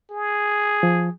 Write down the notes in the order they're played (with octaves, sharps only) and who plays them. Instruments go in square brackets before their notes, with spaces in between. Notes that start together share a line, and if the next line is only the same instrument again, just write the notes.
[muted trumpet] G#4
[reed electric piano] F3